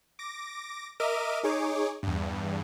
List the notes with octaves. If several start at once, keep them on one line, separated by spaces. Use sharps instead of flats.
D6 A#6
A#4 D#5 E5 D6 F6 D#7
D#4 G#4 C#5 D6
E2 G2